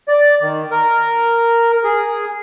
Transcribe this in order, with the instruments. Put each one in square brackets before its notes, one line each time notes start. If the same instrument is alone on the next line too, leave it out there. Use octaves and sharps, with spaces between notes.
[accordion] D5
D#3
A#4
G#4